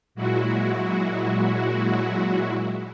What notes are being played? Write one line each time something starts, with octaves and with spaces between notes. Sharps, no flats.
A#2 F#3 G#3 E4 F#4